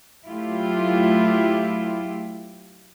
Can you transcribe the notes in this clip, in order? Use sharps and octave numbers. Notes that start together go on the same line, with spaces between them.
F#3 A3 E4 F4 G4